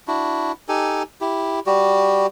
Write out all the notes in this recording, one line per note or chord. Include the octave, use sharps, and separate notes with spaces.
D4 E4 F#4
D#4 G4 A4 G#5
E4 G4
G3 F#4 G4